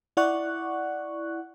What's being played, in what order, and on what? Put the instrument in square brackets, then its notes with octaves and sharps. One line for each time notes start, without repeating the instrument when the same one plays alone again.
[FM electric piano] E4 D5 F#5 C#6 F#6